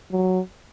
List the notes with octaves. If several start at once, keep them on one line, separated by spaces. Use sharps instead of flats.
F#3